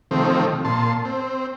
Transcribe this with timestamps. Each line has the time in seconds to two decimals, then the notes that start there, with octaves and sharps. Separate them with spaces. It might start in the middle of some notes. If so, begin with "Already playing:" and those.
0.11 C3 D#3 F3 A3 C4
0.65 A#2 A5 C6
1.05 C4